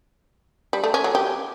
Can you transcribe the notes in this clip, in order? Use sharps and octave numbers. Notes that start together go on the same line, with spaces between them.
G3
A3
C#4
F#3
G4